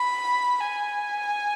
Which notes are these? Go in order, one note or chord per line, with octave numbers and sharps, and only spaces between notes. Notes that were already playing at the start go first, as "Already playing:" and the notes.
Already playing: B5
G#5